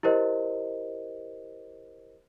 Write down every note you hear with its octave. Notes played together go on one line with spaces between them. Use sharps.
E4 G4 A#4 C5 D#5